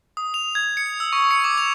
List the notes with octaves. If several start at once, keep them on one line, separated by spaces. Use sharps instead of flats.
D#6
F7
G#6
C#7
E6
C#6
C#7
D6
F7